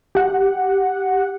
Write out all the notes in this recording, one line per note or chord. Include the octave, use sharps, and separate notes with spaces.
G4 F#5